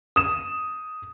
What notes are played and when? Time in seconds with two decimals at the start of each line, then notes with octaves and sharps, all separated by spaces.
0.16 D#6 E7